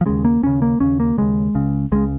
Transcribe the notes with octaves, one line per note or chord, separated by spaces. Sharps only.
F3
D#2 C#3 G#3
A#3
D#2 C#3 C#4
A#3
D#2 C#3 C#4
A#3
D#2 C#3 G#3
C#2 C#3
C#2 C#3 G#3